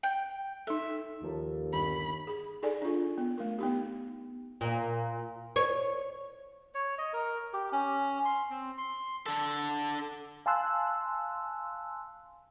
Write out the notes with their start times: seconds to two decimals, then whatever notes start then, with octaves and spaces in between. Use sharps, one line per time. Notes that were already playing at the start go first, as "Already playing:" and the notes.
0.03 G5
0.67 D#4 A4 E5
1.23 D#2 F3 A#3 A4
1.73 G1 D#3 B5
2.27 G#4
2.62 D#4 G#4 A4 D5 G#5
2.82 D4 F4
3.18 B3
3.38 A3 A#4
3.59 B3 D#4 G4
4.61 A#2
5.56 C#5
6.75 C#5
6.98 D#5
7.13 A#4
7.54 G4
7.73 C#4
8.25 C6
8.50 C4
8.78 C6
9.26 D3 A4
10.46 F5 G#5 A5 C6 E6 F#6